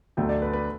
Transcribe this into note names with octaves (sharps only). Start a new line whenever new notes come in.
D2 D3 F#3 A3 G5
D5
B4
B4